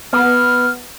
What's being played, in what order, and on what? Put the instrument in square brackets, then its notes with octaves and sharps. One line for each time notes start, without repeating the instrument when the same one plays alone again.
[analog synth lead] B3 [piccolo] F6